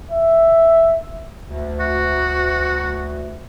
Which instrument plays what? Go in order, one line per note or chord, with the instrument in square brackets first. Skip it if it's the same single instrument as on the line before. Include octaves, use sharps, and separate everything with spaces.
[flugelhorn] E5
[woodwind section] D2
[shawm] F#4